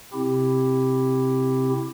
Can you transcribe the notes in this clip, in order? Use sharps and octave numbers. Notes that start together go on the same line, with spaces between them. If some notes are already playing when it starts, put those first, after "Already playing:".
C3 C4 E4 G4